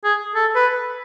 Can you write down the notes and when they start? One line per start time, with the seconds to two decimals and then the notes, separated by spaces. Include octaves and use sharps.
0.04 G#4
0.35 A4
0.56 B4